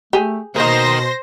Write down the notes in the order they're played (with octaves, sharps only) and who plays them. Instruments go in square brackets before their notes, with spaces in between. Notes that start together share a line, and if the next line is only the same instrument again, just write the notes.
[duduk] A3 [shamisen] G4 G#4
[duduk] B2 [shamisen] D#3 A#3 [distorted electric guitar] A#4 D#5 [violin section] C5 A#6